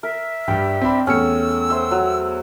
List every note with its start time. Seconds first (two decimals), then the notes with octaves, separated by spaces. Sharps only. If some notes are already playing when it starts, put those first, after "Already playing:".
0.03 A#4 E5
0.48 G2 G3 G5
0.82 C4 D4 B5
1.07 E2 A3 C#4 E6 C#7
1.70 C5 E5
1.91 F#3